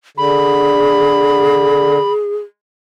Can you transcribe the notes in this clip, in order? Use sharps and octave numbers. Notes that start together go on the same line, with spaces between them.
D3 G#4 B5